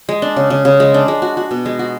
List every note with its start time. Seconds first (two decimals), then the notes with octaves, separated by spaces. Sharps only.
0.09 G#3
0.22 D4
0.36 C#3
0.50 C#3
0.65 C#3
0.80 G#3
0.94 D4
1.08 G#3
1.22 F#4
1.37 F#4
1.51 B2
1.66 G#3
1.79 F#4